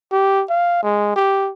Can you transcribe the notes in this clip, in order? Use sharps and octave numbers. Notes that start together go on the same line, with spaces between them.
G4
F5
G#3
G4